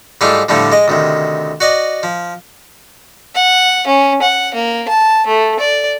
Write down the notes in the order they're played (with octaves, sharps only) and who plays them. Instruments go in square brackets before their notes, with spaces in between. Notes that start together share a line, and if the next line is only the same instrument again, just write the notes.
[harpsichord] G#2 G3 A3 E4 F4 G#5
A2 D3 F3 G3 A3
G#3 D#5
D2 C3 D#3
F#4 D5 D#5
F3
[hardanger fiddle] F#5
C#4
F#5
A#3
A5
A3
D5